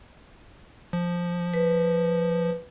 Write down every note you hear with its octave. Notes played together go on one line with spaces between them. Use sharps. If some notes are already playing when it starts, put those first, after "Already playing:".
F3
B4